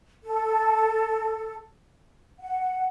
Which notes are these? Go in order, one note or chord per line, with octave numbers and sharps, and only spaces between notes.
A4
F#5